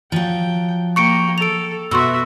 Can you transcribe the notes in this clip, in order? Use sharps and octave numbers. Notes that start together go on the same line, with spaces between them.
F3 F#3 G5
A#3 G5 C#6 C#7 D7
A4 D7 F7
B2 F#4 E5 C6 C#6 E6